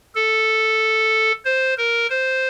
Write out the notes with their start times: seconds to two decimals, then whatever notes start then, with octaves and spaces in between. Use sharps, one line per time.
0.15 A4
1.45 C5
1.78 A#4
2.10 C5